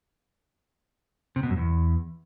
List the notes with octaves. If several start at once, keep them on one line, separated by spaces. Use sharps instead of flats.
C3
B2
F#2
E2